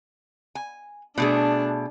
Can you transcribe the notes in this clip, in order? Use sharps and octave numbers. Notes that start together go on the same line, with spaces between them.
G#5
B2 A3 D4 G#4